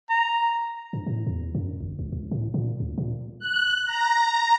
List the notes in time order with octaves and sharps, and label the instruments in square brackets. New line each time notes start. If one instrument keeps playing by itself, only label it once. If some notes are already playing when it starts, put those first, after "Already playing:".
[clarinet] A#5
[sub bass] G2
A2
E2
F#2
G1
C#2
C#2
A2
A#2
D2
A#2
[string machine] F#6
A#5